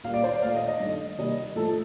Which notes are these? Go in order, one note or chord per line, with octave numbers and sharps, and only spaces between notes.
A#2 G3 A#3 F5
D5
C5
D5
A#2 A3 F5
D#5
D#5
G2 D#3 A3
C3 G3 A#3 D#5
A2 F3 A3 A4